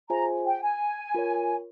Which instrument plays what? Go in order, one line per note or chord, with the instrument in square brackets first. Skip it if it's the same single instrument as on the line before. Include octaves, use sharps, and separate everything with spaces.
[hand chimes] F4 G#4 C5 E5 G#5 [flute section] A#5
[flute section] G5
G#5
[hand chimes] F4 A#4 C#5